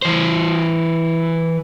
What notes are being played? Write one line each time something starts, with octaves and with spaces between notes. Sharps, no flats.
E3 C5